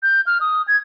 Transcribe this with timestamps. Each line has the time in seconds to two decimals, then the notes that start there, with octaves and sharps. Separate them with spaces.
0.03 G6
0.27 F6
0.41 D#6
0.68 G#6